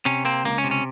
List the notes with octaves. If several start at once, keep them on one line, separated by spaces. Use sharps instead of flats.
C3 C#4
A#3 C4
C#2 A#3
C#4
C3
C#4